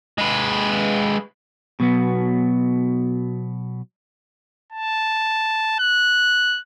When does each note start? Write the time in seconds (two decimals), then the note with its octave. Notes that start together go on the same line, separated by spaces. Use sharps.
0.18 G#3 B4
1.80 B2 F#3 B3
4.73 A5
5.79 F#6